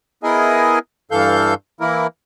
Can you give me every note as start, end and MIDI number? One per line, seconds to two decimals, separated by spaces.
0.23 0.79 59
0.23 0.79 64
0.23 0.79 68
0.23 0.79 70
0.23 0.79 75
0.23 0.79 80
1.11 1.54 43
1.11 1.54 52
1.11 1.54 69
1.11 1.54 77
1.11 1.54 91
1.80 2.07 52
1.80 2.07 58
1.80 2.07 64
1.80 2.07 70